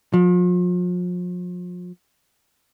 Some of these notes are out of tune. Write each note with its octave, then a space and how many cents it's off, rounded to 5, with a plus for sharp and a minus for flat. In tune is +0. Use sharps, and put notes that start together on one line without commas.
F3 +40